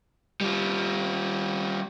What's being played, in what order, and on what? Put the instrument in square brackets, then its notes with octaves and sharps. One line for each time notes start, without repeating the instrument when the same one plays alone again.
[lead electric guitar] G3 F4